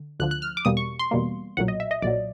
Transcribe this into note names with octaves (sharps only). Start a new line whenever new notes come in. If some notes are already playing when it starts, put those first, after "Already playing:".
Already playing: D3
D2 D3 F3 F#6
F#6
F6
D6
E2 B2 G3 A#3 D#6
C#6
C6
E2 B2 G3 A#3
B1 A#2 F#3 F#5
D#5
E5
D#5
B1 A#2 F#3 D5